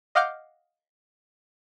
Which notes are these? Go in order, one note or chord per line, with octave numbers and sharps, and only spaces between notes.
D#5 F5 F#5 D6 F6 G6